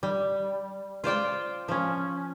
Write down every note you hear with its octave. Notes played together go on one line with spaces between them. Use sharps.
G3
F4 C5 D5 G5
F3 C#4